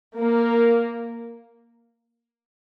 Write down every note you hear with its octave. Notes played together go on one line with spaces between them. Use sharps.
A#3